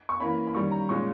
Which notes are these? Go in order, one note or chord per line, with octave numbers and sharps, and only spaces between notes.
C#6
E3 A#3 C#4 B5
B5
D#3 G3 C#4 C#6
A#5
A#2 G#3 C#4 C#6